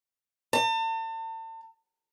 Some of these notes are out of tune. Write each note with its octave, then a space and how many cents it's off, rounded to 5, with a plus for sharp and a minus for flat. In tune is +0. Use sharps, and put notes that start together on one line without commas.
A5 +40